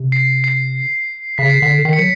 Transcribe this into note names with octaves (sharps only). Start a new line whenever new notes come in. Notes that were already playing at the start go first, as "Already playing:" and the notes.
Already playing: C3
C7
C7
C#3 B6
C7
D3 B6
D#3 C7
C#7
F#3